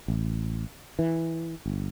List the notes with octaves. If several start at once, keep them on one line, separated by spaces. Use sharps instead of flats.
A1
E3
G1